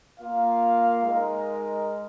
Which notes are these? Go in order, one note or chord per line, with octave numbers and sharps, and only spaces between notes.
A#3 F4 A#4 F5
G#3 D#4 A#4